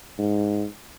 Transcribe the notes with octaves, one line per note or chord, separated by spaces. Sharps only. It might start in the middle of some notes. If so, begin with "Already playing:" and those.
G#2